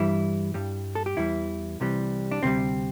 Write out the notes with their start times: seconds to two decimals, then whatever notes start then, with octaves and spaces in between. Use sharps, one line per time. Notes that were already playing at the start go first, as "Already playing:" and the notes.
Already playing: G2 E3 G3 E4
0.54 G2 G3
0.95 A4
1.06 G4
1.17 E2 E3 G3 E4
1.80 C2 C3 E3 G3
2.31 D4
2.43 D2 C3 E3 G3 C4